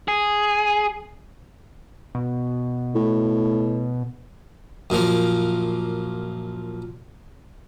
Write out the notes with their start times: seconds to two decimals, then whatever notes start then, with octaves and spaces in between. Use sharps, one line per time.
0.08 G#4
2.15 B2
2.95 A2
4.90 F#2 A#2 F3 A#3